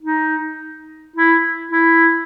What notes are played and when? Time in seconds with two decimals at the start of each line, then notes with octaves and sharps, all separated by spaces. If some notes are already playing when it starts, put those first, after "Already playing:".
0.02 D#4
1.16 E4
1.72 E4